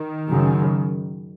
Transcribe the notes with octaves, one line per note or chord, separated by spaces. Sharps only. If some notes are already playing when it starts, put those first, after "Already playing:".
Already playing: D#3
F#2 C#3